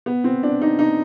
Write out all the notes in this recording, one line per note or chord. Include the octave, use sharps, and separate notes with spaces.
B3
C4
D4
D#4
D#4